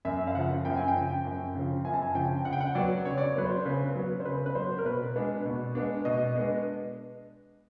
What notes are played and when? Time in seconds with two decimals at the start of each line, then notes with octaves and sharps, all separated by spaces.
0.05 F#2 E5
0.27 F5
0.35 C#3 F3 F#5
0.65 F#2 G5
0.76 G#5
0.88 G5
0.95 C#3 F3
1.25 F#2
1.55 C#3 F3
1.85 F#2 G#5
1.94 A5
2.02 G#5
2.15 C#3 F3 G5
2.45 C#3 F#5
2.53 G5
2.61 F#5
2.75 F#3 B3 D5
3.05 C#3 C#5
3.18 D5
3.25 C#5
3.36 F#3 B3 B4
3.45 C5
3.65 C#3 B4
3.95 F#3 B3
4.20 C5
4.25 C#3 B4
4.46 B4
4.55 F#3 B3 C5
4.79 A#4
4.85 B2 B4
5.16 G#3 B3 D4
5.45 B2
5.75 G#3 B3 D4
6.05 B2 D#5
6.36 G#3 B3 D4